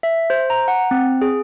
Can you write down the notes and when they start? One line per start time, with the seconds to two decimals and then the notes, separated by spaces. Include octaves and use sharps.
0.03 E5
0.30 C5
0.50 A#5
0.68 F#5
0.91 C4
1.22 G#4